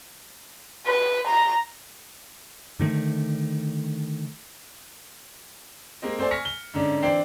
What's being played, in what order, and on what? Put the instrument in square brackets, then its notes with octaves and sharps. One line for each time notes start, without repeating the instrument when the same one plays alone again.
[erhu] B4
A#5
[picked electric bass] D3 D#3 A3
[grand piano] G#3 A#3 C4 D#5
A3 C4 C5 D5 G#5
G#5 C#6 F6 A#6 B6 C#7
G7
G#2 D3 C#4 D4
E3 C4 D4 G5 C7